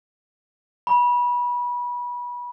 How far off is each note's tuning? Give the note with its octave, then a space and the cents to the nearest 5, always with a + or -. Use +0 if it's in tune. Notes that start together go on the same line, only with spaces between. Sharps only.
B5 -25